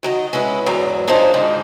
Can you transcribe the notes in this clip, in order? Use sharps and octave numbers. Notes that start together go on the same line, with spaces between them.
D#3 F#3 D#5
G#3 C#4 E4 B4
E2 G#2 F#3 A#5
D4 D#4 F4 G#4 C5 C#5
G#2 D3 D#3